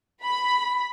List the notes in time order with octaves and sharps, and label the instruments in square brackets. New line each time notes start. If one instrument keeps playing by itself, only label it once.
[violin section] B5